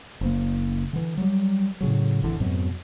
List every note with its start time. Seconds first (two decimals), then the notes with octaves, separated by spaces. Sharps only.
0.21 F#1 A#3
0.93 D3 E3
1.17 F#3 G3
1.81 A2 C#3 F#3
2.22 G#1 E2 D3 E3
2.40 F2 G#2 B2 F#3